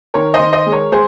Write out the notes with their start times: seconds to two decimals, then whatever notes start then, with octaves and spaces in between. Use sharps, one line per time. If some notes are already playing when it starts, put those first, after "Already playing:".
0.14 D#3 A#4 C#5
0.34 C5 D#5
0.40 D#3
0.52 C5 D#5
0.66 G#3
0.72 A#4 C#5
0.92 G#3 G#4 C5